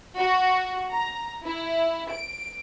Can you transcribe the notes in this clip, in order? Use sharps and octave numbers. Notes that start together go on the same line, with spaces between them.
F#4
A#5
E4
D7